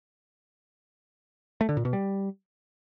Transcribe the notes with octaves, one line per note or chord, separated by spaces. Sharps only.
A3
D3
A#2
B2
G3